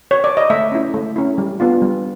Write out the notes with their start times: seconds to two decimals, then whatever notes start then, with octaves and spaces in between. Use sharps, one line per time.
0.11 C#5
0.24 D5
0.37 D#5
0.50 A3 E5
0.72 C#4 E4
0.94 A3
1.16 C#4 E4
1.38 G3
1.60 B3 D4 F4
1.82 G3